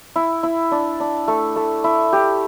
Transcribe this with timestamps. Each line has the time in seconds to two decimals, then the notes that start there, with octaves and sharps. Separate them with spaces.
0.16 E4
0.43 E4
0.72 D4
1.00 D4
1.28 A3
1.56 A3
1.84 E4
2.13 G4